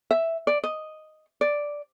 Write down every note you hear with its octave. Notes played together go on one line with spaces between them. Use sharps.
E5
D5
D#5
D5